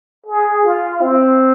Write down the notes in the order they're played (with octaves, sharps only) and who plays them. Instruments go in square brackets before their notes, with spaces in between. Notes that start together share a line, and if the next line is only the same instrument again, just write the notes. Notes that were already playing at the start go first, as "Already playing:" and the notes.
[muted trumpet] G#4
F4
C4